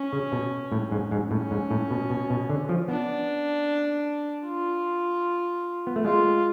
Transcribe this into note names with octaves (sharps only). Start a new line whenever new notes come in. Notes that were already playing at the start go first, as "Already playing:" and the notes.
Already playing: C#4
C#3
B2
A2
G#2
G#2
A2 C#4
G#2
A2
B2
B2
B2
D3
F3
B3 D4
F4
B3
A3
G#3 F4